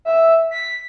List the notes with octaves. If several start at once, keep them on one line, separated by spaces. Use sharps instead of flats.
E5
B6